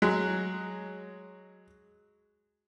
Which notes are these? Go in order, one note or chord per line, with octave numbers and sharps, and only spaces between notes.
F#3 G#3